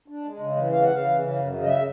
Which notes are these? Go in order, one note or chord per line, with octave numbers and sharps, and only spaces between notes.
D4
G#3
C#3
E3
C#3 F5
F#5
C#3
F5
E3
C#3
F#2
C#3
D#5
E5